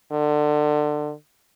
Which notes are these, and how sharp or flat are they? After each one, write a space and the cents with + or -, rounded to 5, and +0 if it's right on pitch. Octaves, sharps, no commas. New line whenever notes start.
D3 +25